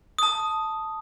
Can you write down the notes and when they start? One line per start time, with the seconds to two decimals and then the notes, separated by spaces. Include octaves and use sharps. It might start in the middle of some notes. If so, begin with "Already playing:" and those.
0.19 A5 D#6